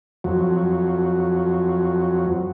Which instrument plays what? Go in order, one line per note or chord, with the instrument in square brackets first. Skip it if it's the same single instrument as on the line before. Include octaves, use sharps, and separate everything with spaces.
[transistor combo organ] F2 F#3